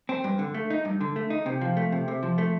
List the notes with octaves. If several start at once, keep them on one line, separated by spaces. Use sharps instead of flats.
C4
G2
D3
A3
D#4
G2
D3
A3
D#4
C3
F3
A3
C3
C3
F3
A3